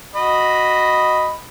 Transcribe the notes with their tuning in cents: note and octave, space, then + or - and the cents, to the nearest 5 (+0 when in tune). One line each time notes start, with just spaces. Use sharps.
F#4 -5 D#5 +0 B5 +0